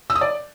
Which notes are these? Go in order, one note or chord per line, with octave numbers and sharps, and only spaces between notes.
E6
D#6
D5